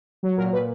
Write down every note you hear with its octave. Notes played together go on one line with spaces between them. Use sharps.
F#3
A#2 A#4
A#2 B4